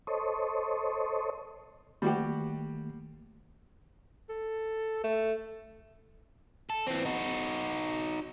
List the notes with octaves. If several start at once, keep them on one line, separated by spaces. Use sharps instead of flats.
A4 C5 C#5 D#5
D#3 G3 A3 A#3 F#4 G4
A4
A3
A4
E3 C4
D#4 F#4